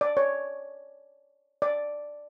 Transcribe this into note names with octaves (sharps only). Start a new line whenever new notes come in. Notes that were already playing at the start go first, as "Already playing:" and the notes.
D5
C#5
D5